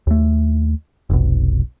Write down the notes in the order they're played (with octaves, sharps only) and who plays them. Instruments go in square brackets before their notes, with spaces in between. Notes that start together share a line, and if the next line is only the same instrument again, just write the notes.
[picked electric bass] D#2 A3
F1 B1